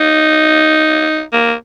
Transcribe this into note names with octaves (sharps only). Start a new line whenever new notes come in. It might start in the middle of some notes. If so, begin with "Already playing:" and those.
Already playing: D#4
A#3